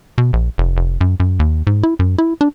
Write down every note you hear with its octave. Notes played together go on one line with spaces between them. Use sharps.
B2
A#1
F1
F1
F#2
F#2
D#2
G#2
E4
F#2
E4
D4